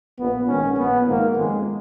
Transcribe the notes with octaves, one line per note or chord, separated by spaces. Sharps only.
A#1 A#2 B3
A#1 G#2 D#3 C#4
A#1 A#2 B3
G#1 G#2 D#3 A#3
F#1 F2 D#3 G#3